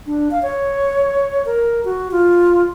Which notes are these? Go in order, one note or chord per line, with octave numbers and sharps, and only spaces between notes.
D4
F5
C#5
A#4
F#4
F4